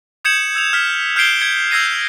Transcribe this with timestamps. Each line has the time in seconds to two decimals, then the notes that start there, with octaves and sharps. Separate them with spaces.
0.25 D#6 G6 G#6 C#7 E7 F#7
0.55 E6 G6 F7
0.73 F6 B6
1.16 F6 G6 G#6 C7 D7 G7
1.39 G#6 C#7 G7
1.71 E6 G6 G#6 A#6 C7 D#7